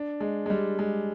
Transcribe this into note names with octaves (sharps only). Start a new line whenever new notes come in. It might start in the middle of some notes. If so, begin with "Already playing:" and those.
Already playing: D4
G#3
G#3
G3
G#3